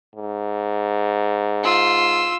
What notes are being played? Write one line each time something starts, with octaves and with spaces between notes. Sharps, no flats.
G#2
F4 E6